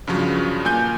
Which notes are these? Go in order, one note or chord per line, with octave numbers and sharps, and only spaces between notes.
G2 C#3 F3 F#3
A#2 G#5 G6